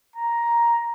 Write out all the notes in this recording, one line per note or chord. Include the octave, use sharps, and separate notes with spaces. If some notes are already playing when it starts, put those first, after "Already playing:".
A#5